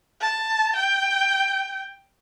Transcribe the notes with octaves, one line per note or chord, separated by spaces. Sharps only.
A5
G5